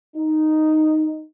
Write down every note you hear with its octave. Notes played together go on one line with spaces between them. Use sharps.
D#4